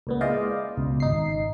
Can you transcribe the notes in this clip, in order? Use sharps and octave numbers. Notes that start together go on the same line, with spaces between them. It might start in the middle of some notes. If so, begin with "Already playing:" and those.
C#2 A#2 B3
G#3 E4 C5 D5 D#5 F5
C#2 B2
G#1 D#4 C7